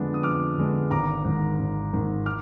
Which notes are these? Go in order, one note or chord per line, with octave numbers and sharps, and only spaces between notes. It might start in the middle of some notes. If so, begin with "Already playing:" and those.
Already playing: F2 D3 G#3 B3 D4
D#6
F2 D6 F6
D3 G#3 B3 D4
G#1 A#5 D6
G#2 D#3
G#1
G#2 D#3
D6 F6